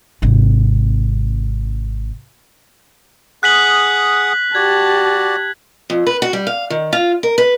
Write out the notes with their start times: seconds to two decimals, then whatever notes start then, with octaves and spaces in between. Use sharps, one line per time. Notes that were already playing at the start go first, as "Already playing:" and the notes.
0.22 G#1 C3
3.43 G#4 F#5 D#6 F#6 B6 F#7
4.55 F#4 G4 D5 A5 G#6
5.90 F2
6.07 B4
6.22 F#4
6.33 G3
6.47 F5
6.70 D#3
6.93 F4
7.23 A#4
7.38 B4